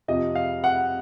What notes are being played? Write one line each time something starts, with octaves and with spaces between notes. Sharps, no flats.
F2 C3 F3 D#5
F5
F#5